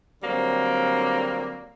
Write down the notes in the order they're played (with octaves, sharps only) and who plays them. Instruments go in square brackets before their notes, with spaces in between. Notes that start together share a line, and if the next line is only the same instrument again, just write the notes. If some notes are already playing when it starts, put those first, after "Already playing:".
[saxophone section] D3 F#3 G3 A#3 C4